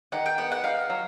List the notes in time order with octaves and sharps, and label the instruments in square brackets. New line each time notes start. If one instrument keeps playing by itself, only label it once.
[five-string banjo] D#3 [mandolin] F#5
[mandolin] G5
[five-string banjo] B3 [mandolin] F#5
[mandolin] F#5
[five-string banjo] D#4 [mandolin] F5
[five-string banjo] F#3